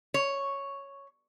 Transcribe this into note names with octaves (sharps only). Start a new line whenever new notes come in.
C#5